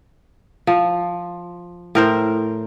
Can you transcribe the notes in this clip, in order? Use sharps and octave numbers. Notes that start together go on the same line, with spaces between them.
F3
A2 A#4 C5